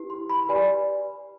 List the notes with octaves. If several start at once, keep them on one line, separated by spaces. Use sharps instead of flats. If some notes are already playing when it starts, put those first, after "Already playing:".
Already playing: E4 G4 B4
C6
B5
G4 B4 D5 G#5